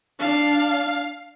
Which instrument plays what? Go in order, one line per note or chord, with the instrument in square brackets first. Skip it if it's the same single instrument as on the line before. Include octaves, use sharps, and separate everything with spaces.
[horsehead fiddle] D4 [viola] F5